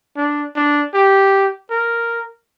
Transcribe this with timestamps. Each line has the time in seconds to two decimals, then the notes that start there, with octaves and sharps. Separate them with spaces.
0.17 D4
0.56 D4
0.94 G4
1.70 A#4